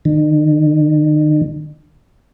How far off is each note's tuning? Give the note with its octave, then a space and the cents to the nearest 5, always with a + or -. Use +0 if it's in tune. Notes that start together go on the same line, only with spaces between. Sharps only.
D#3 -40